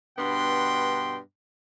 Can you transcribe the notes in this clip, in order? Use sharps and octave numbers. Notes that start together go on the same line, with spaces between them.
G2 B2 B3 D4 G5 C6